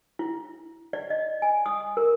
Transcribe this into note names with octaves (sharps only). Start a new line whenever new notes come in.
E4
D5
D#5
G#5
D#6
A#4